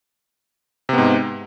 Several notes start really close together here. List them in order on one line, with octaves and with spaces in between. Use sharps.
C3 B3 G#2